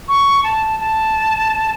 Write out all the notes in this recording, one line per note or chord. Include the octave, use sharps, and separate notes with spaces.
C#6
A5
A5